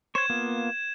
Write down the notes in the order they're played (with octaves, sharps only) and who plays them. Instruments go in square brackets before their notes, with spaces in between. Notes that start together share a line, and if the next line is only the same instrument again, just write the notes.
[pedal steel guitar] C5 C#5 [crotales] G#6 E7
[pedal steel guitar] A#3 B3 F4